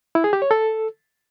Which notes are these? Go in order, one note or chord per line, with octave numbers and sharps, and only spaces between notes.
E4
G#4
G4
C#5
A4